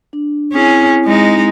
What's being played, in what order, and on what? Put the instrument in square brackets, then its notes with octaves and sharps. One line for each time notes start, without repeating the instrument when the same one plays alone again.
[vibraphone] D4
[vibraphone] C4 E4 [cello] C#4 G#4
[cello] G#3 D#4